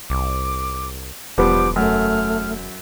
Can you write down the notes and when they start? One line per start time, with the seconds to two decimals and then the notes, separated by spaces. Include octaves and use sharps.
0.10 C2 D6
1.38 E1 F3 G3 B3 D6
1.76 F#2 A3 F6